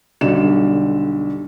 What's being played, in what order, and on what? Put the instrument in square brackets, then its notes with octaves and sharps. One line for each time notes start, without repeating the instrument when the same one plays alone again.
[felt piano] B1 D3 G3 E7